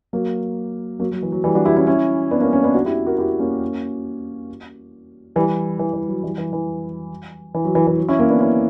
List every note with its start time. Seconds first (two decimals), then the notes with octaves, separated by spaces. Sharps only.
0.13 F#3 A#3
1.00 F#3 A#3
1.11 F#3
1.22 E3
1.32 F#3
1.44 E3 G3
1.55 D4 F#4
1.66 E4 G4
1.76 C#4 E4
1.87 C#4 E4
2.31 B3 D4
2.41 A#3 C#4
2.53 A#3 C#4
2.63 B3 D4
2.74 D4 F#4
2.85 E4 G4
3.07 F#4 A#4
3.18 E4 G4
3.40 A#3 C#4
5.36 E3 G3
5.79 E3
5.93 E3
6.08 F#3
6.23 E3 G3
6.38 E3
6.53 E3
7.54 E3
7.65 F#3
7.75 E3
7.87 E3
7.98 F#3
8.08 C#4 E4
8.19 A#3 C#4
8.30 B3 D4
8.40 C#4 E4